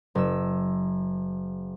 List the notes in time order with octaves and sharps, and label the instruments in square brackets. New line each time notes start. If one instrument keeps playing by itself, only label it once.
[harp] F#1 E6